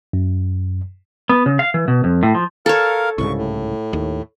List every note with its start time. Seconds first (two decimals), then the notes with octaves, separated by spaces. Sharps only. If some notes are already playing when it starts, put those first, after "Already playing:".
0.13 F#2
1.29 B3
1.46 C#3
1.59 F5
1.74 E3
1.88 B2
2.04 F2
2.23 A2
2.35 F3
2.66 A4 A#4 C#5 F5
3.18 C2 G#2 C#3 C#6
3.37 A2
3.93 D#2